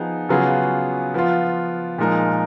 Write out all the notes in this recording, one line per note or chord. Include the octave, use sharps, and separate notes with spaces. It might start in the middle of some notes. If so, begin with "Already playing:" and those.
Already playing: F3 B3 D#4 G#4
C#3 F#3 B3 F4 G#4
F3 B3 F4
A#2 F3 G#3 D#4 A#4